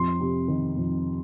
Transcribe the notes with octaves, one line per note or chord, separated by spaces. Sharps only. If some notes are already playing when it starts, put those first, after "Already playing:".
Already playing: F2 C6
C3
D#3
F2